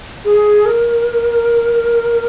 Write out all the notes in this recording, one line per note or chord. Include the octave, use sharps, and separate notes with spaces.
G#4
A#4